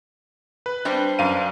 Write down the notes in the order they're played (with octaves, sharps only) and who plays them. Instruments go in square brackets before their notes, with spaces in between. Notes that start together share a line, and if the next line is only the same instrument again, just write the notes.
[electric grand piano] B4
[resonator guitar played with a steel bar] G3 C4 D4
[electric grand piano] F#2 F5 D#7